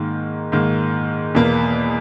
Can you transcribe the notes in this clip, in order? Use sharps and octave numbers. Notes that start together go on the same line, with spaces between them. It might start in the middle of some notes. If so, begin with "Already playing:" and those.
Already playing: G#2 D#3 A#3
G#2 D#3 A#3
E2 B2 A#3